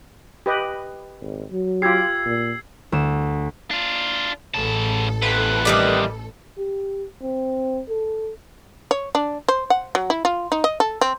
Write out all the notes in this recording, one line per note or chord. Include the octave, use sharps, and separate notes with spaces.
G4 B4 D#5
G#1
F#3
F4 G4 E6 G#6 C7
A#2
D2 E7
D4 F4
A1 C#3 A4 A5
E2 C3 B4
D#3 G3 D5
G4
C4
A4
C#5
D4
C5
F#5
F#3
E4
F4
D#4
D#5
A4
C4